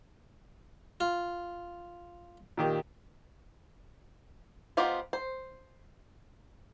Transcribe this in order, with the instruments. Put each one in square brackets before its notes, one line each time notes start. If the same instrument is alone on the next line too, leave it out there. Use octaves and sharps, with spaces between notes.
[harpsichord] F4
[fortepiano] A#2 D#3 G4
[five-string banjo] B3 D#4 F4 G4 C5
C5